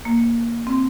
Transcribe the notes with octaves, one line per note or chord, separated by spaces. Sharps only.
A#3
C4